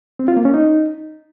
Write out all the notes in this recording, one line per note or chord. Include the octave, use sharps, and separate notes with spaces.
C4
F4
A#3
C#4
D#4